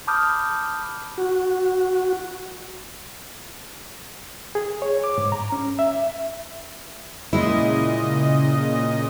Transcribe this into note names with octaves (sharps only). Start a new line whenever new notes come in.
A5 B5 D6 D#6 F6 G6
F#4
G#4
C#5
D6
G#2
A#5
C#4
E5
A#2 C#3 G#3 E4 D#5